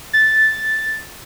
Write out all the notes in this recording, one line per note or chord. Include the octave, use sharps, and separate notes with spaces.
A6